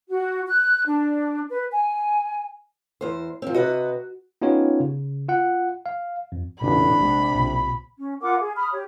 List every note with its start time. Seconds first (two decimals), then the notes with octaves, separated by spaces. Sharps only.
0.10 F#4
0.47 F#6
0.86 D4
1.50 B4
1.71 G#5
3.01 E2 C5
3.42 F3 C4
3.54 C3 F#4 B4 D#5
4.42 B3 C#4 D#4 F4 G4 C#5
4.80 C#3
5.29 F4 F#5
5.86 F5
6.32 F2
6.61 E1 A1 A#2 C#3 D4 B5
6.99 A#1 C3 G#3
7.34 B1 A#2 C#3
7.99 C#4
8.21 F4 A#4 F#5 D6
8.40 G#4
8.56 B5 D#6 F6
8.73 G4 C#5